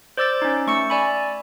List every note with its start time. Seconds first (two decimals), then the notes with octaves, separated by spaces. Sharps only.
0.17 C5 D5 D6 E6 G6 A6
0.42 C#4 D#4
0.67 A3 C#6 E6 C#7
0.90 D5 G#5 B5